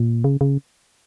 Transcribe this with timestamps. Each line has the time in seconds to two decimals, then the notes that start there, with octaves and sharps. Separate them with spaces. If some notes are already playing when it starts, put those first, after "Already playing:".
Already playing: A#2
0.24 C#3
0.41 C#3